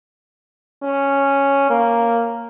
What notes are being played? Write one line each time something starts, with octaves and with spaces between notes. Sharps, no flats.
C#4
A#3